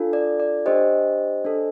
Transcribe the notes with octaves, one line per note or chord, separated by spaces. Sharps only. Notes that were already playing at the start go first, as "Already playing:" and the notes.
Already playing: D4 F4 A4
D5
D5
D4 G4 C5 D#5
D4 A4